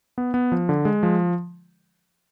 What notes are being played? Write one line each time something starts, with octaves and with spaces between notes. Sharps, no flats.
B3
B3
F3
D3
G#3
F3